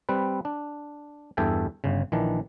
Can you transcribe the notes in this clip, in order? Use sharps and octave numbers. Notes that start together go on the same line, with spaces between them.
G3 C4 B4
D4
E2 G2 A4 E5 G5 G#5
G1 C#3
A#1 D#3 E3 D4